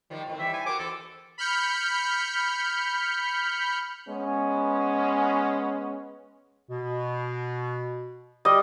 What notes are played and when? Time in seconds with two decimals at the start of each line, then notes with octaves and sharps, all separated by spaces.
0.10 D#3 F3 G3
0.27 A2 D#3 C4
0.39 E3 G3 E5
0.54 G#5
0.66 F#4 A#4 C5 D6
0.79 E2 A4
1.38 B5 F6 G6 C#7
4.09 G#3 B3 C#4
6.69 B2
8.45 G3 D#5